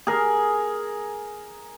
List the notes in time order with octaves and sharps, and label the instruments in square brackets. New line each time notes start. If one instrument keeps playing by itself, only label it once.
[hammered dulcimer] G#4 A#4